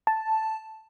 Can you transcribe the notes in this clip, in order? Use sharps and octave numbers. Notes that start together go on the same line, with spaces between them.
A5